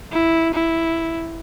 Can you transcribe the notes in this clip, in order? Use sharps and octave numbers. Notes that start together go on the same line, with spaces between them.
E4
E4